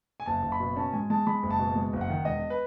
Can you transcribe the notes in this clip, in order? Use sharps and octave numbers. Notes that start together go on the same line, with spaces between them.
G#5
F#1 A5
F#1
B5
B2
C#4 A5
G#2 G#5
G#3 A5
G#3 B5
F#1
A5
B2
G#3
F#1
F#5
D#3
E1 D#5
B4